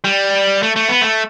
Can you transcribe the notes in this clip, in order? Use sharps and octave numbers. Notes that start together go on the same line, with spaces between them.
G3
A3
A3
B3
A3